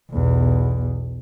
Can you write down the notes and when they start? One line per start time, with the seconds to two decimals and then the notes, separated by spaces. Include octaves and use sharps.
0.11 B1 E2